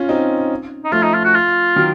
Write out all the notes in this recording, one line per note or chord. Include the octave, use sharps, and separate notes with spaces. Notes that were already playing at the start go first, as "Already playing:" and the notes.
Already playing: C#4 F4
C4 D#4
D#4
F3 A3 F4
D#4
F4
F#4
F4
D#3 F#3